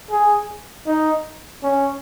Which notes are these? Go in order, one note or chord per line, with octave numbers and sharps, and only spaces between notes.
G#4
D#4
C#4